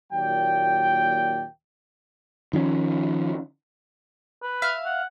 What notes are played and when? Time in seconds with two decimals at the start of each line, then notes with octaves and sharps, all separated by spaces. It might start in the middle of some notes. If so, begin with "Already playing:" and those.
0.13 D#2 A#2 F#3 D5 G5
2.53 D#3 F3 B3 C#4
4.43 B4
4.62 E5 F5 F6
4.85 F#5